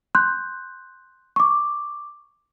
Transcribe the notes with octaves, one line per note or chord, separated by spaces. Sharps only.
C6 F#6 G6
C#6 D6